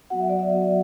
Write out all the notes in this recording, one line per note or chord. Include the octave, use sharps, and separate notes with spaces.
F#3 B3 F#4 F#5
E5
D5
E5
F#3 B3 F#4